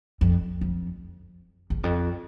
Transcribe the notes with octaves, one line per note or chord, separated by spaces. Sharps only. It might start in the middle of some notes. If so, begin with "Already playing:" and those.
F2
F2
E2
F2